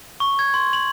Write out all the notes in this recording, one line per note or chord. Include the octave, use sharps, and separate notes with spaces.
C#6
G#6
C6
F#7